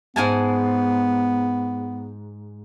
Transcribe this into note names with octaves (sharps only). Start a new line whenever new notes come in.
G#2 B3 G#5 A5